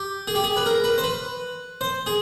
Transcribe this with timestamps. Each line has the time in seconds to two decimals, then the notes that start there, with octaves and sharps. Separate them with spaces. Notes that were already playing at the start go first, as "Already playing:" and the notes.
Already playing: G4
0.27 G#4
0.35 G4
0.44 G#4
0.56 B4
0.66 A#4
0.84 B4
0.98 C5
1.04 B4
1.81 C5
2.06 G#4